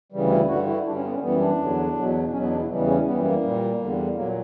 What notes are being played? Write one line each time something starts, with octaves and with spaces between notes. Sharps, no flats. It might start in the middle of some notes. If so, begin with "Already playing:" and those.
D2 C#3 E3 G3
E4
G2 D3 G3 F#4
E4
G2 D3 G3 D4
C#4
B3
C#4
F#2 E3 G3 B3
D4
E2 D3 F#3
E2 B2 F#3
E2 B2 F#3 C#4
B3
D4
E4
E2 C#3 E3 G3
C#4
F#2 E3 G3 B3
A#3
A#2 G3
E2 D3 G3
A#2 F#3 A#3